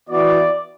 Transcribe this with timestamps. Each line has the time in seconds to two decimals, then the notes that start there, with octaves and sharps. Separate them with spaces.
0.09 E3 B3 F#4 D5